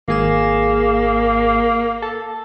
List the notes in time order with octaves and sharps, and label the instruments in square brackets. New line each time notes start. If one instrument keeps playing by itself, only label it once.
[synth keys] G#1 G#4 E7 [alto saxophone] A#3
[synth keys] A4